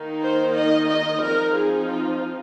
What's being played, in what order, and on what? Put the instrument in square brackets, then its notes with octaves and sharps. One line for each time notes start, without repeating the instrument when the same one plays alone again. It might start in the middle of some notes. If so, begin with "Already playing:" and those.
Already playing: [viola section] D#3 A#3 D#4
C5
D#5
D#5
F3 C4 D#4 A#4
G#4
F4